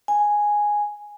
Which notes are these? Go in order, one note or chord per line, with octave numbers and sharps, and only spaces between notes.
G#5